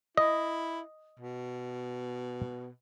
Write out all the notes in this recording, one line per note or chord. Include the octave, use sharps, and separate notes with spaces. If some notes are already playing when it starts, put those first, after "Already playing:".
E4 D#5
B2